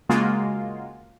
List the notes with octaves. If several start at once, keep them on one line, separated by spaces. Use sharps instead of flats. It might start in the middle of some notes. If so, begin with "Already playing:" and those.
C#3 G#3 A#3 F4 F#4